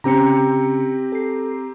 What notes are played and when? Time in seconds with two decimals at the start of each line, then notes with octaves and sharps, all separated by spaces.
0.04 C#3 C4 C#4 G4 A#5 C#7
1.12 A4 C7